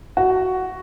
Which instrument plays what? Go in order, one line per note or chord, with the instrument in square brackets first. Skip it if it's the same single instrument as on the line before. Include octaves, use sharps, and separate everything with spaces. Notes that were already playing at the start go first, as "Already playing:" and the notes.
[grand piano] F#4